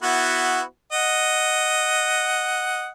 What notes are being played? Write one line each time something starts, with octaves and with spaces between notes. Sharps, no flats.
B3 E4 F#4
D#5 F#5